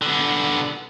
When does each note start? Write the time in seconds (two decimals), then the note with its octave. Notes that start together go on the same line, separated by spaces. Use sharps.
0.02 D3 B3